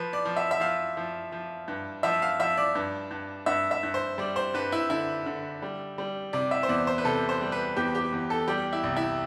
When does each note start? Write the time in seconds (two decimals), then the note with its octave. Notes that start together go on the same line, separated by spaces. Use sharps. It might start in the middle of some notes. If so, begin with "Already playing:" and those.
Already playing: F3 B4
0.13 D5
0.25 F3
0.37 E5
0.51 E5
0.60 F3 F5
0.97 F3
1.32 F3
1.68 G2
2.03 F3 E5
2.22 F5
2.39 F3 E5
2.57 D5
2.75 G2
3.11 G2
3.46 G2 E5
3.71 E5
3.83 G2
3.94 C5
4.18 G3 D5
4.36 C5
4.54 G2 B4
4.72 E4
4.90 D3 E4
5.26 D3
5.62 G3
5.98 G3
6.33 C3 D5
6.51 E5
6.63 C5
6.69 E2 D5
6.87 C5
6.98 B4
7.05 C3 A4
7.29 C5
7.41 G3
7.52 B4
7.76 E2 G4
7.95 G4
8.12 E2
8.30 A4
8.48 G3 G4
8.73 E4
8.83 C2
8.96 E4